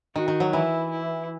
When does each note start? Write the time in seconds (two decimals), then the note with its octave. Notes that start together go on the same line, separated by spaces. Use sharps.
0.15 D#3 F#4
0.28 D#3
0.40 F#3
0.53 E3 E4
0.91 E4